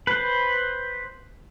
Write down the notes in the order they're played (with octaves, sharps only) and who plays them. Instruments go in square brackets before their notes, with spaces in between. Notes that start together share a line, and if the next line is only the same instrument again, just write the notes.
[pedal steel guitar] B4 C5